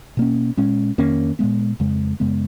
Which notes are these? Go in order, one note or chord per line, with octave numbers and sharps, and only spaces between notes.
B2 A#3 C#4
A#2 G#3 C#4
F2 D#3 A#3 C#4
A#2 G#3 B3
F2 C#3 G#3
F#2 C#3 G#3 B3